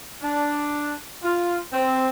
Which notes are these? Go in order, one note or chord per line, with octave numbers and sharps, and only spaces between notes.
D4
F4
C4